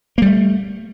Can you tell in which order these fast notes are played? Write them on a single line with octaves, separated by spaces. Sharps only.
A#3 G3 A3